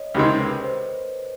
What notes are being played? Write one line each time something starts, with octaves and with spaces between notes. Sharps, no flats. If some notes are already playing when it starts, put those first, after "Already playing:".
Already playing: C#5 D#5
C#2 C3 D#3 G#3 C4 A#4
B4
C5